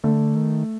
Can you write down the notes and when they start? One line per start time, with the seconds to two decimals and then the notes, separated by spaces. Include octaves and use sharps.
0.04 D3 A3
0.35 D#3